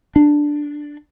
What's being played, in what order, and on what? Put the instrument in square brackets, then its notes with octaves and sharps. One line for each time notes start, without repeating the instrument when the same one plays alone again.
[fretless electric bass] D4